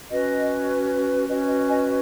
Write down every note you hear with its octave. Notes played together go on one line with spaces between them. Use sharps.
C#4 F#4 B4 D#5
C#4 F#4 B4 D#5
D#5
D#5 G#5